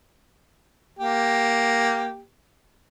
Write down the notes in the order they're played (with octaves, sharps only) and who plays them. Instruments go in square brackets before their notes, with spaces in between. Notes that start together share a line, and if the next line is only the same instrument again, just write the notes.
[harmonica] A#3 G4